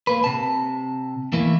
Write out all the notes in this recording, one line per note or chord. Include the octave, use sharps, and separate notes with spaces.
A#3 B4
C3 A5
E2 E3 A3 A#3 E4